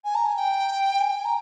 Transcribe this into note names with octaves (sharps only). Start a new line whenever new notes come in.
G#5
A#5
G#5
G5
G#5
G5
G#5
A#5